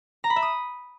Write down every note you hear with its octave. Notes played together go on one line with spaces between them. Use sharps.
A#5
B5
E5
D#6